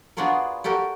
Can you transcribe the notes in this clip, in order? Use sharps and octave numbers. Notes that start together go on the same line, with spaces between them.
B3 D4 F4 F#4 G#4 A#4
F#4 G4 A4 A#4